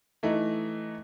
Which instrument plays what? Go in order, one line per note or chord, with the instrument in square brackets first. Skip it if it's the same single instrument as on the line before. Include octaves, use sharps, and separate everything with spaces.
[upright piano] E3 A3 D#4